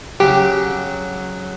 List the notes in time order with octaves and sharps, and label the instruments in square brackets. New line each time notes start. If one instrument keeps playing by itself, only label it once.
[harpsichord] C#3 F#3 [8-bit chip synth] G4